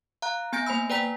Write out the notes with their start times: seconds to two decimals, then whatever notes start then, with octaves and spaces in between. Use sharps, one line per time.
0.22 F5 A#5 F#6
0.53 B3 G#5 G6 A#6 D7
0.67 A#3 C5 G#5 B5 E6
0.90 B4 D5 G5 A#5 B6